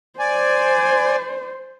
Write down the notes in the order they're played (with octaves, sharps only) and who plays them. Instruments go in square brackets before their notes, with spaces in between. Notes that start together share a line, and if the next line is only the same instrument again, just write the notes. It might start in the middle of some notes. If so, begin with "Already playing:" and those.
[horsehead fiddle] C5 [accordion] D5 G#5